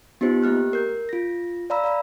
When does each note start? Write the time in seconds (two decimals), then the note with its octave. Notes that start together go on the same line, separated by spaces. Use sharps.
0.21 B3 D#4 F4 G4 C5
0.43 A3 A#3 G4 F6 F#6
0.73 A#4 G6
1.09 F4 A#6
1.70 D5 F5 A#5 B5 E6
1.84 D5 F5 A#5 B5